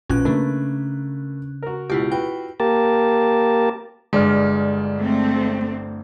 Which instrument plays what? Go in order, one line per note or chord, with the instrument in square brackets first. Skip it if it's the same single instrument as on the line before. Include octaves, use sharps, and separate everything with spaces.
[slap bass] A#1 [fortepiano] F3 B3 [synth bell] C#4 F#6
[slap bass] C#3 D4 [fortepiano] A3 A#3 B4
[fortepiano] F#4 A#4
[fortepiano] C#2 B2 [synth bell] E4 F4 G4
[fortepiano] F#4 B4 [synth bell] G5
[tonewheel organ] A#3 G4 A#4 A5
[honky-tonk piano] G1 D5 F6 [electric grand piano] G#3
[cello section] A3 C4